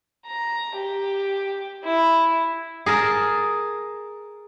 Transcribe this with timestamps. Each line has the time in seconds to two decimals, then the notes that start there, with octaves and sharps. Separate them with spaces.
0.27 A#5
0.77 G4
1.84 E4
2.86 G#4 A#4 A5